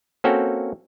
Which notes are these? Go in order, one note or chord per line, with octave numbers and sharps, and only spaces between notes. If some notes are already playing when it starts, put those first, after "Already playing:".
A#3 C4 C#4 F#4 A4 G5